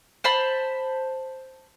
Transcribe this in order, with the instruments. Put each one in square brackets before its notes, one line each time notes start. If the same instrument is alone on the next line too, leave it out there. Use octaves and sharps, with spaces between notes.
[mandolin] C5 A5 B5